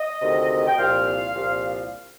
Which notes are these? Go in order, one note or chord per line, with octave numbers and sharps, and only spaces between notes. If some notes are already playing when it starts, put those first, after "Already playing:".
Already playing: D#5
D2 C3 D#3
G5
C2 A#2 F3 F5
C2 A#2 F3